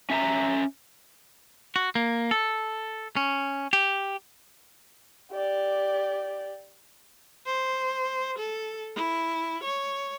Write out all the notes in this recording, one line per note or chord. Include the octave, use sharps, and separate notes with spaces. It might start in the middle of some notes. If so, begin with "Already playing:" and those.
C#4 E5 A5 A#5
F#4
A#3
A4
C#4
G4
G4 D5
C5
A4
E4
C#5